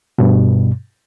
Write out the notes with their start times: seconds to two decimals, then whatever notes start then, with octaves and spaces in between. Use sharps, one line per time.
0.18 G2 B2